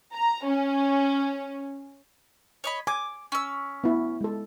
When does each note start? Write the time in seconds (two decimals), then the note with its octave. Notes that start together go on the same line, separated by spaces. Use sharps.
0.13 A#5
0.46 C#4
2.64 C#5 D#5 B5
2.87 G#5 D6
3.32 C#4 E6
3.84 B3 E4
4.21 G#3 A4